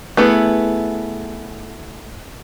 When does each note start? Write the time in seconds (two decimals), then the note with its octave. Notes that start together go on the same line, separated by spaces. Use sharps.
0.17 A3 B3 E4 G#4